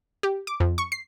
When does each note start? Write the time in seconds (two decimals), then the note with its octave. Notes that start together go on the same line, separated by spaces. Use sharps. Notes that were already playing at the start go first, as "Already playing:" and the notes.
0.23 G4
0.47 D6
0.60 F2
0.78 C#6
0.92 C7